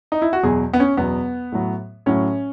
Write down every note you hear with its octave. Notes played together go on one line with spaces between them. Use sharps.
D#4
E4
F#4
E2 B2 F#3 G#4
B3
C#4
E2 B2 F#3 B3
A2 F#3
A2 F#3 C#4